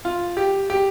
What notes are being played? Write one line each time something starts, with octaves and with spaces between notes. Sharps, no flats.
F4
G4
G4